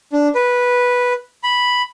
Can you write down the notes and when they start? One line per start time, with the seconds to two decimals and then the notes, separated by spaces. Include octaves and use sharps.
0.12 D4
0.35 B4
1.43 B5